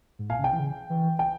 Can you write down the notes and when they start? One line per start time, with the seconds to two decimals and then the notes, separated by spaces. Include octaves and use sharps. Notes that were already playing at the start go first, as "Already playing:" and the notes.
0.19 G#2
0.30 A#2 F5 G#5
0.39 C#3
0.44 C3 G5
0.53 E3
0.59 C#3
0.90 E3
1.19 G5